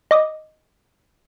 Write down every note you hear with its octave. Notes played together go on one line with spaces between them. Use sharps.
D#5 D6 D#6